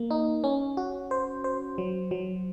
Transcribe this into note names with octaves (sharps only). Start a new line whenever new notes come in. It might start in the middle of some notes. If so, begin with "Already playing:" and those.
Already playing: A#3
D#4
C#4
F#4
C5
C5
F#3
F#3